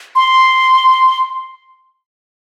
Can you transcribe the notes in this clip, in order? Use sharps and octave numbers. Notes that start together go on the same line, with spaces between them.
C6